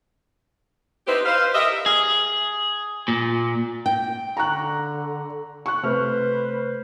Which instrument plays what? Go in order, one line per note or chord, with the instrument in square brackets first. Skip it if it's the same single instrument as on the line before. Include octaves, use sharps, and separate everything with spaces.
[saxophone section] C4 D#4 E4 G4 B4 C5
B4 C5 F5
G4 A#4 D#5 E5
[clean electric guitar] G#4
A#2
[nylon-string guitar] G5
[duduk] D3 [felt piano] A#5 C#6 F#6
[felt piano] C#6 F#6
[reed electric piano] C3 A3 [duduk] B4 [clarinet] C5 [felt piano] F6